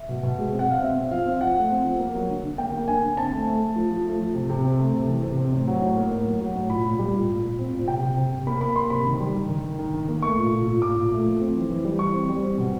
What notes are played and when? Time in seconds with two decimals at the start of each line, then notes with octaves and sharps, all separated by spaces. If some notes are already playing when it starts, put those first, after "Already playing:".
Already playing: E5
0.09 B2
0.23 B2
0.38 G#3
0.53 C4
0.59 F#5
0.67 B2 F5
0.82 C4 E5
0.97 C4
1.11 F3 F5
1.26 C4
1.41 F3 F#5
1.55 A3
1.70 C4
1.85 F3
1.99 A#3
2.15 F#3
2.29 D3
2.43 D3
2.58 A#3 G5
2.74 A#3
2.88 D3 G#5
3.03 D3
3.17 C4 A5
3.32 A3
3.47 A3
3.61 A3
3.76 F3
3.91 F3
4.06 A3
4.20 F3
4.34 C3
4.50 C3
4.65 C4
4.79 A3
4.93 C3
5.08 E3
5.23 C3
5.38 C4
5.53 A2
5.67 F#3
5.82 A2
5.97 A#3
6.11 A2
6.26 F#3
6.41 F#3
6.56 A2
6.70 A#2 B5
6.85 A#2
6.99 G3
7.14 A#2
7.29 A#2
7.43 A#2
7.59 C4
7.73 A#2
7.88 C3 G5
8.02 C3
8.17 C3
8.32 C3
8.47 A#3 B5
8.61 A#3 B5
8.75 A#3 C6
8.90 C3 B5
9.05 D#3
9.20 G3
9.35 D#3
9.49 D#3
9.64 D#3
9.79 D#3
9.94 D#3
10.08 A#3
10.22 A3 C#6
10.38 A#2
10.53 A#2
10.67 A#2
10.82 A#2 D6
10.96 A#2
11.11 A3
11.25 F3
11.41 C4
11.56 E3
11.70 E3
11.85 G3
11.99 E3 C#6
12.14 C4
12.29 G3
12.43 C4
12.58 B2